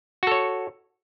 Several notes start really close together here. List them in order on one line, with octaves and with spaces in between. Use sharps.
F#4 A4 C#5